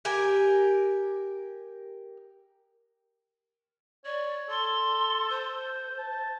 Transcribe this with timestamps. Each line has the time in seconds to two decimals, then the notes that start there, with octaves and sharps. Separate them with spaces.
0.05 G4 A#4 G#5
4.05 C#5 D5
4.50 A4 C6
5.29 C5
5.99 A5